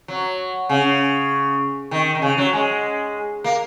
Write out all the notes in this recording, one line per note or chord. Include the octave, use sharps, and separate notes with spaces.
F#3
C#3
D#3
D#3
C#3
F#3
G#3
A#3